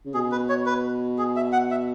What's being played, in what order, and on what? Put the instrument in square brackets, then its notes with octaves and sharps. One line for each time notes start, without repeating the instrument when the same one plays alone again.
[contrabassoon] C#3
[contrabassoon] B2 [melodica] G#4
[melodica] B4
C#5
B4
G#4
E5
F#5
E5